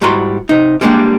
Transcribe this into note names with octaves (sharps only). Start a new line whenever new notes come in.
G#2 G3 E4 F#4 A#5 C6
C3 D#4
G3 G#3 A#3 B3 D4 G4